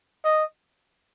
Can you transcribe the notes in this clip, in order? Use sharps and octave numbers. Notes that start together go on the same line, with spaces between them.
D#5